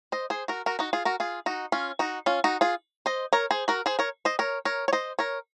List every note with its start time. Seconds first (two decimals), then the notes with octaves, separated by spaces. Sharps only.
0.12 C5 D#5
0.30 G#4 C5
0.48 F#4 A#4
0.66 F#4 A#4
0.79 D#4 F#4
0.93 F4 G#4
1.05 F#4 A#4
1.20 F4 G#4
1.46 D#4 F#4
1.72 C#4 F4
1.99 D#4 F#4
2.26 C#4 F4
2.44 D#4 F#4
2.61 F4 G#4
3.06 C5 D#5
3.33 A#4 C#5
3.51 G#4 C5
3.68 F#4 A#4
3.86 G#4 C5
3.99 A#4 C#5
4.25 C5 D#5
4.39 A#4 C#5
4.65 A#4 C#5
4.88 C#5
4.93 C5 D#5
5.19 A#4 C#5